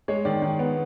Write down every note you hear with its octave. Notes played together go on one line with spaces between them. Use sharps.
G#3 C#5
D#3 D5
D#3
B3